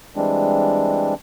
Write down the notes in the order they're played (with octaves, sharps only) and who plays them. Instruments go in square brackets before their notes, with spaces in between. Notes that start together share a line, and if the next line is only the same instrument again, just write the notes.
[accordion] E3 G3 G#3 C4 D4